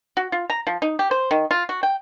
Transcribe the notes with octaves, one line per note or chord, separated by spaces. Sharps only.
F#4
F4
A#5
F3
D#4
G4
C5
D#3
F4
F#4
G5